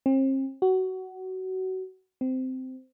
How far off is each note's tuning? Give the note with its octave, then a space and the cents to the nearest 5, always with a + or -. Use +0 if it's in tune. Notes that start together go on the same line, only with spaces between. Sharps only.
C4 +40
F#4 +20
C4 -15